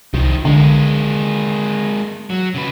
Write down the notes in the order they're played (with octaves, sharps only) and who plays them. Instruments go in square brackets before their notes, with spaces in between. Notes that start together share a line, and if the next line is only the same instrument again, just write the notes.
[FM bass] C2 [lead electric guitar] D#3 F3
[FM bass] D3 [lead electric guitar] G#3 A#3
[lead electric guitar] F#3
C#3 B4